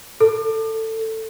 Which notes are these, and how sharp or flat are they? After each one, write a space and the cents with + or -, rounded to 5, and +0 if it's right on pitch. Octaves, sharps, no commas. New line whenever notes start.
A4 +15